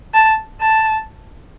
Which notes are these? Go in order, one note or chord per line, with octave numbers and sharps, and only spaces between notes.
A5
A5